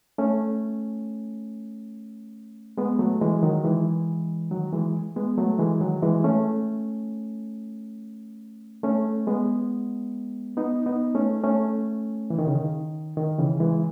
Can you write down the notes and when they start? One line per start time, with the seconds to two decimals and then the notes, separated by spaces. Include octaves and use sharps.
0.18 A3 C#4
2.77 G#3 B3
2.99 F#3 A3
3.21 E3 G#3
3.43 D#3 F#3
3.64 E3 G#3
4.51 D#3 F#3
4.73 E3 G#3
5.16 G#3 B3
5.37 F#3 A3
5.59 E3 G#3
5.81 D#3 F#3
6.02 E3 G#3
6.24 A3 C#4
8.83 A3 C#4
9.27 G#3 B3
10.57 B3 D#4
10.86 B3 D#4
11.15 A3 C#4
11.44 A3 C#4
12.30 E3
12.39 D#3
12.47 C#3
12.55 D#3
13.17 D#3
13.38 C#3 E3
13.60 E3 G#3